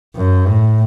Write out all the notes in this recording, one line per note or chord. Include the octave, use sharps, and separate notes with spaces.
F#2
A2